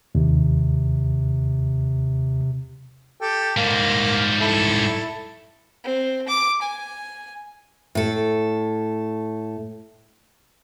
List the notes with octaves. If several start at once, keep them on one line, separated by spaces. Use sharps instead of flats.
D#2 C3
G4 A4 G5
G#2 G3 A#3 F5
E4 A4
C4
D6
G#5
A2 A4